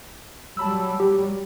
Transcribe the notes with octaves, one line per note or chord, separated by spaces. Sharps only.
F#3 G3 A5 B5 E6
G4